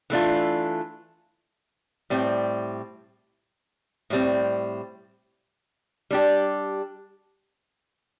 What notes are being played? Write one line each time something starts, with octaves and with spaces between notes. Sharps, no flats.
E3 A3 D4 F4
A2 G3 C4
A2 G3 C4
G3 D4 G4